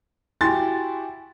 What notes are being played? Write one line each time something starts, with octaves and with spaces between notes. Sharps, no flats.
E4 F#4 G4 G5 G#5 C6 A6